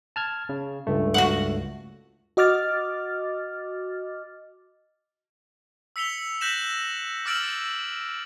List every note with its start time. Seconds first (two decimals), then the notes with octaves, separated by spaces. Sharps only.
0.16 A5 F6 G#6
0.49 C#3
0.87 C#2 G2 A3
1.14 F#4 F5 F#5
2.37 F#4 D#5 D6 F6 A6
5.96 E6 B6 C#7 F7 G7
6.41 F#6 G6 A#6 B6 E7 F#7
7.25 D6 E6 F6 A6 D7 F#7